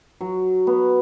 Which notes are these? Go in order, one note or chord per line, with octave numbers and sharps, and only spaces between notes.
F#3
B3